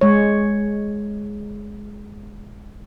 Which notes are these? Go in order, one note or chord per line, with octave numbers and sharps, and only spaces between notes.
G#3 C#5